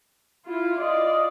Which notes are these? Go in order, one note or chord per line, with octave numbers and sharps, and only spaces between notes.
E4 F4
F4 D5 D#5